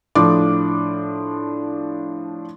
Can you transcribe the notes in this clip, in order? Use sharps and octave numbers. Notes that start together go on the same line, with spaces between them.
A2 F3 D4 D6